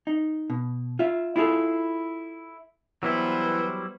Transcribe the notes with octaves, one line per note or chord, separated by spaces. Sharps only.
D#4
B2
F4 E5
E4 F4 G#4 A4
E3 F#3 G3 B3 E4 C5